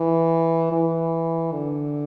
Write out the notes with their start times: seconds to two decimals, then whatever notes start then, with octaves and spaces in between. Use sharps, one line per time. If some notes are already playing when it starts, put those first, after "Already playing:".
Already playing: E3
0.72 E3
1.52 D3